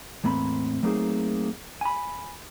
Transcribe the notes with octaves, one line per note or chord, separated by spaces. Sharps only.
E2 A2 A#3 C4 B5
F#3 A3 A#3 C4 D#4 G#4
G#5 B5